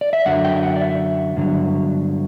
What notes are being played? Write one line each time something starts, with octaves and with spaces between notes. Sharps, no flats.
D5
E5
F#2 D3 F#3 F#5
G5
E5
F#5
D5
E5
G2 D3 F#3